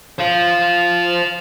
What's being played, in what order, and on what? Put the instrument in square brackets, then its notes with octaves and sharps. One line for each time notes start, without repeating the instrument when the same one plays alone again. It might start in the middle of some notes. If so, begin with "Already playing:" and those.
[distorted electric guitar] C5 F5